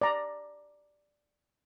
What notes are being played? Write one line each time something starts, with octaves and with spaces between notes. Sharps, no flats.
D5 A#5